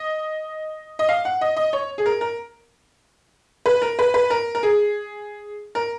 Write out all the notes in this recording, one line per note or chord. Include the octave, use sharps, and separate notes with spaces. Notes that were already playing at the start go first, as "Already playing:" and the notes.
Already playing: D#5
D#5
F5
F#5
D#5
D#5
C#5
G#4
A#4
A#4
B4
A#4
B4
B4
A#4
A#4
G#4
A#4